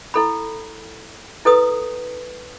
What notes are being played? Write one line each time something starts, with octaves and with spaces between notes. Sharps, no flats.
E4 A4 B5
E4 A4 B4 D#6